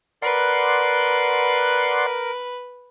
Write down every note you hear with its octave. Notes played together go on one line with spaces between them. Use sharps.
A#4 B4 D5 F#5 C6